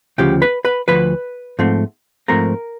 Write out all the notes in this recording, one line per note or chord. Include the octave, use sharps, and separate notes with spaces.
D2 C#3 F3 G4 G5
B4 B5
B4 B5
D2 C#3 F3 B4 B5
G#2 F3 A3 C4
G#2 F3 A3 C4 A#4 A#5